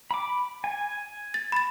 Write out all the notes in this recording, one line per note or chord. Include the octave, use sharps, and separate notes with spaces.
B5 D6
G#5
A6
B5 A6